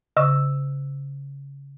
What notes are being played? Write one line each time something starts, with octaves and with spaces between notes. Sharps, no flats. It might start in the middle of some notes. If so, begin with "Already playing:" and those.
C#3 D#5 C#6 E6